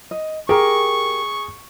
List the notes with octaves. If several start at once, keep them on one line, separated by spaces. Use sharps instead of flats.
D#5
G4 G#4 A#4 C#6